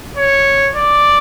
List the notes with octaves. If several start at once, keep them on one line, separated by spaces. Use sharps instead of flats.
C#5
D5